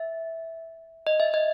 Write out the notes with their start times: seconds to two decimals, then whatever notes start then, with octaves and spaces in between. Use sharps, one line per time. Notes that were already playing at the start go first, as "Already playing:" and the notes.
Already playing: E5
1.07 D#5
1.20 E5
1.34 D#5